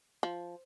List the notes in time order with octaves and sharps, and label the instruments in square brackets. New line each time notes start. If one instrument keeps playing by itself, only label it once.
[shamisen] F3